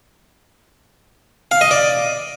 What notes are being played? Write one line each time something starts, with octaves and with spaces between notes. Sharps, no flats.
F5
D#5
D5